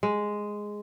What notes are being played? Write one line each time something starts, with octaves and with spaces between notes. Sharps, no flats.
G#3